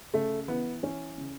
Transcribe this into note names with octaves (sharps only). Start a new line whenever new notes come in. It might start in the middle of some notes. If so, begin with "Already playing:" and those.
C#3 A3
E3 B3
E3 C#4
C#3